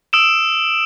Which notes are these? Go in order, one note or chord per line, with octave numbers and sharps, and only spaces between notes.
D#6 E6 D7 E7